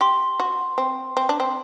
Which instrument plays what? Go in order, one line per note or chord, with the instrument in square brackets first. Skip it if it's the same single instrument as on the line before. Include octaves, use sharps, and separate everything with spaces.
[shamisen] G4 [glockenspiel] C6
[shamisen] F#4
C4
C4
D4
C4